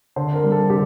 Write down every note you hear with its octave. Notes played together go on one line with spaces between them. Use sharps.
D3 C5
A#4
G3
A4
D3 G4